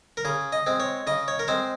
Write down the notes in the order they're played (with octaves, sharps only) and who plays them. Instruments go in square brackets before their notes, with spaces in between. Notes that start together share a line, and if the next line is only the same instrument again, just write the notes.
[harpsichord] A#4
C#3 G#4
D#5
G#3 C4
C#5
C#3 D#5
C#5
A#4
G#3 C4 C5